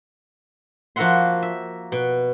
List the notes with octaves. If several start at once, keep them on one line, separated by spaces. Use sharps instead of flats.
F3 A#3 F#4 E5 F#5 C6
E5
B2